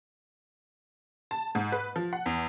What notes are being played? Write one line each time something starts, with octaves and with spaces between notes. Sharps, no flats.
A5
G#2
B4
F3
F#5
E2